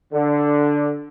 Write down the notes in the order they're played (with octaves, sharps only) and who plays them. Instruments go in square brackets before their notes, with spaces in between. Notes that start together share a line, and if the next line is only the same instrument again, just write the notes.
[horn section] D3